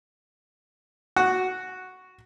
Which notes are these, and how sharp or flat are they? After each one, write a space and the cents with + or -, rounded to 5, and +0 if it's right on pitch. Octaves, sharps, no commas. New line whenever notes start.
F#4 +0 F#5 +0